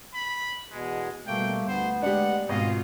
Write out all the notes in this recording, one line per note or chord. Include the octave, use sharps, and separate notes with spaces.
B5
E2 B2 G#3
B2 G3 A3 A#3 G5
D2 B3 C5
G#3 D4 G4 F#5
G#1 B2 G#3 F4 D#5